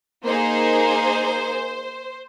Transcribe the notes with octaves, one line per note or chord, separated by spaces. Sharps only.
A#3 D#4 G#4 C5